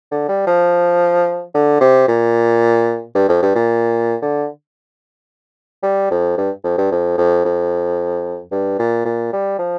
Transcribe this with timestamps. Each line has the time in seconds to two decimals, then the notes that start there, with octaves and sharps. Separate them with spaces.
0.11 D3
0.29 G3
0.47 F3
1.54 D3
1.81 C3
2.08 A#2
3.15 G2
3.29 F2
3.43 G2
3.56 A#2
4.22 D3
5.83 G3
6.11 F2
6.38 G2
6.64 F2
6.78 G2
6.91 F2
7.18 F2
7.45 F2
8.51 G2
8.79 A#2
9.06 A#2
9.33 G3
9.59 F3